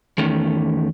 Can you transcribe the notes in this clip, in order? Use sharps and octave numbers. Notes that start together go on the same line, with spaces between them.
E2 D#3 A3 C#4